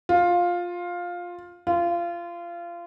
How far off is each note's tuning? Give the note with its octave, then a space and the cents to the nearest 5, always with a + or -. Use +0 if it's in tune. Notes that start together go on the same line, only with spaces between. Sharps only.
F4 +10
F4 -25